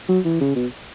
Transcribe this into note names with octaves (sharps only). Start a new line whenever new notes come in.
F#3
E3
C#3
B2